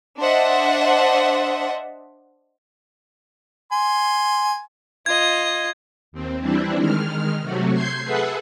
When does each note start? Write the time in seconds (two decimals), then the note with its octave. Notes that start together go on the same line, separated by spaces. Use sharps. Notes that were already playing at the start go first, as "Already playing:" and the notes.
0.19 D4 C5 D#5 E5 F#5
3.72 G#5 C6
5.06 F4 D#5 G#6
6.12 D#2 C4
6.41 E3 G3 C4 D4 E4
6.76 D#3 G#3 F6
7.41 C3 F#3 A3 F#4
7.73 C6 G6 G#6 C7
8.04 G#4 A4 B4 E5 F#5